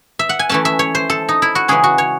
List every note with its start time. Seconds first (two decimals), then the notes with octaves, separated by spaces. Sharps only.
0.19 E5
0.29 F#5
0.39 G#5
0.49 E3 A3 C#4 A5
0.65 E5
0.79 C#5
0.95 C5
1.10 A4
1.29 D#4
1.42 E4
1.55 F#4
1.68 C#3 E3 G#3 C#4 G#4
1.84 F#4
1.98 C#5